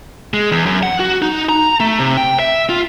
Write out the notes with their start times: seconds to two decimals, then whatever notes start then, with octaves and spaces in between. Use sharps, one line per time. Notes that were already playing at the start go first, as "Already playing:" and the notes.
0.34 G#3
0.52 E2
0.65 F#2
0.83 F#5
1.00 F#4
1.22 D#4
1.49 A#5
1.80 A3
1.99 C3
2.17 G5
2.39 E5
2.69 F4